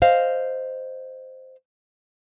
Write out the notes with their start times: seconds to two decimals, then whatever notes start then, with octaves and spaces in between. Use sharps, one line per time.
0.02 C5 D#5 F5